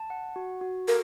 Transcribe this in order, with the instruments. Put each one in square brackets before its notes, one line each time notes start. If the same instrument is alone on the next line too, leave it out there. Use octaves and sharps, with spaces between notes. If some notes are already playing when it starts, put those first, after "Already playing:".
Already playing: [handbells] A5
F#5
F#4
F#4
[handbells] A4 [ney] A#4